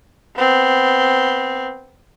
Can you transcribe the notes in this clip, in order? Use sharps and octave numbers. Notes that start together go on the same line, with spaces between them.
B3 C4